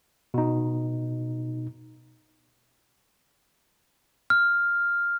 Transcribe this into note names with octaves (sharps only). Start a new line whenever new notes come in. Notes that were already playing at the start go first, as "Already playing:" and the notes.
B2 D#4
F6